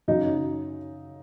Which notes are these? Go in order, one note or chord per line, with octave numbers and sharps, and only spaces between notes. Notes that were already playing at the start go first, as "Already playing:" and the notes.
F#2 C#3 F#3 D#4 D#5